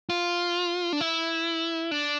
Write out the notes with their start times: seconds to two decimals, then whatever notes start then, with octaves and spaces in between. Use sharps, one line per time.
0.09 F4
0.93 D4
1.01 E4
1.91 D4